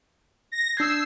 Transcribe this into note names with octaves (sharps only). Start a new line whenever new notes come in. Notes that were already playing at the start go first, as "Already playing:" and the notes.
A#6
D4 E6 G6 G#6 C7